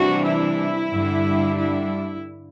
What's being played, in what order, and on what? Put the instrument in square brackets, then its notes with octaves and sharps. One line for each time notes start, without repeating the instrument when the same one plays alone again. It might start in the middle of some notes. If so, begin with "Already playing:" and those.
Already playing: [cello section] C3 E3 G3 D4 F#4
E4
G2 D3 G3 D4
E4